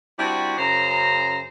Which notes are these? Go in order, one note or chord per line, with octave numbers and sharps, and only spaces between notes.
G3 C4 D4 E4 F#4
F#2 C#3 C5 A#5